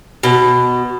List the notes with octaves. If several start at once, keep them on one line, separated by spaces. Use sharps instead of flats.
B2